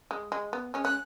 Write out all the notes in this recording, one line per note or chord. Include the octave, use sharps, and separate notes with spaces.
G#3
G#3
B3
G#3 C#4
C#4 F#6